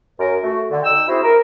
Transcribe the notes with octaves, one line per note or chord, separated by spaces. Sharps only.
F#2 A#4
A3 F#4
D3
D#4 G5 E6
C4 E4 F#4 G#4 C5
A#4